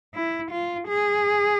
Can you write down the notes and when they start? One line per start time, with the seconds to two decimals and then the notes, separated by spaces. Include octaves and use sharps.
0.14 E4
0.51 F4
0.88 G#4